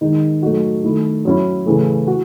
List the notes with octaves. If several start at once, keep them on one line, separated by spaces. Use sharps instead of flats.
D#3 G#3 D#4
F#3 A3 D#4 F#4
D#3 A3 E4
F#3 C#4 E4
C#3 E3 A3
F#4